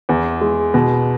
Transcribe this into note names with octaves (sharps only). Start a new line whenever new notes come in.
E2
G#3
B2